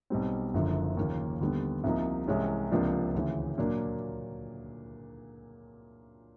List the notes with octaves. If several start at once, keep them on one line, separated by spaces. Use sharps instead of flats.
B1 B2 G3 C4
F#1 F#2 D3 F3
D#2 C#3 F3 A#3
D#2 D3 G3 B3
C2 C3 F3 A#3 D#4
C2 C3 E3 G#3 C#4
C#2 C3 F3 A#3 D4
D2 C#3 E3
A#2 F#3 A#3 D4